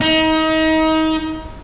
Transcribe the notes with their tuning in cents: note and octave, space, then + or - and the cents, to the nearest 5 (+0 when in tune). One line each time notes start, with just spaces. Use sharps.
D#4 +30